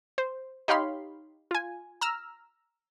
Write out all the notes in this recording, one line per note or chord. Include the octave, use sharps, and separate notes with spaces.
C5
D#4 G4 C#5 F5 B5 C6
F4 G#5
A#5 E6 F6